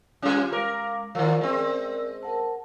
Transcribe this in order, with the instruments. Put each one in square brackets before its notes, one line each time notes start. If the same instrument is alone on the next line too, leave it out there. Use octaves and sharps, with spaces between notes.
[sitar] G3 C#4 [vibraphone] F4 G4
[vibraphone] G#3 F5 D6 [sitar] A#4
[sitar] D#3 F3 [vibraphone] A#4 C5 D5
[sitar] G#3 C4
[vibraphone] A#4 F#5 A5